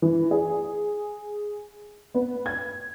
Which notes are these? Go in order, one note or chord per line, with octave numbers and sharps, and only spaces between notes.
E3
G#4
B3
G#6